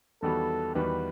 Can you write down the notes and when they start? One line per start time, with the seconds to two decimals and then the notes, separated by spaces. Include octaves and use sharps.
0.22 E2 D#3 G3 B3 F#4 A4
0.75 E2 D#3 G3 B3 F#4 B4